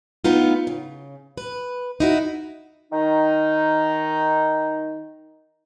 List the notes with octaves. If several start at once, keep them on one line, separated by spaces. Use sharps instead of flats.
A3 B3 D#4 F4
C#3
B4
D#4 E4 F#4
D#3 D#4